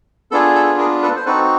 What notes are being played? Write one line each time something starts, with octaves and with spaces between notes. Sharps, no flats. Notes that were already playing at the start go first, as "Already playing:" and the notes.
B3 D4 F4 G#4 A4
A4
G#4 A#4
A4 B4
C5
C4 D#4 F#4 A4 B4